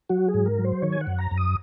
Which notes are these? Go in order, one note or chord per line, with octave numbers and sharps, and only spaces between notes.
F#3 F#4
G#4
G#2
A#4
F#3
C5
D#3 C#5
G#5
F#5
F#2
A#5
F#2
D#6